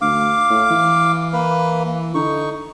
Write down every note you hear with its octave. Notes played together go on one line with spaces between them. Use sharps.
D2 F5 D6
A2
E3
A#3 B4
D3 D#4 C#6